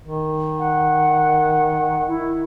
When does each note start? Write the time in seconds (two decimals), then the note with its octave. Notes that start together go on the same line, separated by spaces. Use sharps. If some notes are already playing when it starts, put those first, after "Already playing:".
0.04 D#3
0.59 F#5
2.08 E4